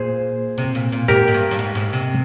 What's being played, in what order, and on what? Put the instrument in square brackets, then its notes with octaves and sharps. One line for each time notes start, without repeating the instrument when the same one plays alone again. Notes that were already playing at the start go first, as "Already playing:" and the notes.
Already playing: [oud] A#2 [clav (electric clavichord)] G#4 C5
[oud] C3
A#2
A#2
[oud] G#2 [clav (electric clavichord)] G4 A#4
[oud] G#2
G2
G2
G#2
G#2
C3